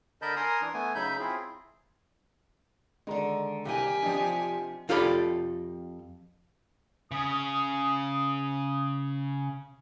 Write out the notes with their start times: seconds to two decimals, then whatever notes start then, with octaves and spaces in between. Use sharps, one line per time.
0.22 D3 A#4 D#5 A5 B5 G6
0.36 A#4 G#5 A#5 C6 D#6
0.61 E3 D4
0.74 A3 B3 G#5
0.95 C#3 F#3 D#4 E5 B5 G6
1.19 C4 E4 F4 G#4
3.07 D3 D#3 G#3 A#5
3.65 C2 A#3 C4 G4 D#5 G#5
4.02 C3 F3 D4 D#4 F4
4.89 F2 F4 G4 A4 D5 B5
7.11 C#3 D#6